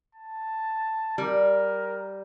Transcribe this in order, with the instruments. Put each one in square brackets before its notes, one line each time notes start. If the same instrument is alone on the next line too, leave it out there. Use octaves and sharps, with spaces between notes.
[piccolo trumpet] A5
[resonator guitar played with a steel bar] G3 [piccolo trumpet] A#4